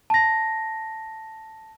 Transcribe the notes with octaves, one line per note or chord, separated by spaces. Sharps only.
A5 A#6